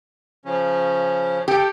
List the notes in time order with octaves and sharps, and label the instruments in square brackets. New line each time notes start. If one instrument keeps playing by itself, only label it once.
[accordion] C#3 F3 C#4
[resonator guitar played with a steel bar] G4 [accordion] A4 G5